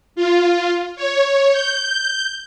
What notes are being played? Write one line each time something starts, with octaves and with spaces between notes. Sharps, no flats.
F4
C#5
G6